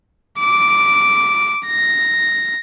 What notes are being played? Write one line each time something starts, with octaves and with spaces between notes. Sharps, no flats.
D6 D7
A#6